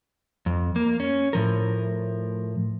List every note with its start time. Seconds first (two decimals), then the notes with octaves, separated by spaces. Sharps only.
0.46 F2
0.76 A#3
1.00 C#4
1.33 A2 F3 A#4